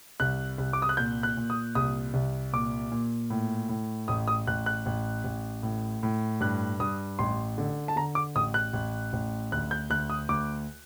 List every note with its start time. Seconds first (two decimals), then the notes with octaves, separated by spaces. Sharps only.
0.20 C2 F#6
0.58 C2
0.73 D6
0.82 D#6
0.89 F#6
0.97 A#2 G6
1.23 F#6
1.37 A#2
1.50 D#6
1.75 C2 D#6
2.14 C2
2.53 A#2 D6
2.92 A#2
3.30 A2
3.69 A2
4.08 A1 D#6
4.28 D#6
4.47 A1 F#6
4.66 F#6
4.86 A1
5.24 A1
5.63 A2
6.03 A2
6.41 G2 F#6
6.80 G2 D#6
7.19 A1 C6
7.58 D3
7.88 A5
7.96 D3 A#5
8.15 D6
8.35 A1 D#6
8.54 F#6
8.73 A1
9.13 A1
9.52 D2 F#6
9.71 G6
9.90 D2 F#6
10.10 D#6
10.29 D2 D6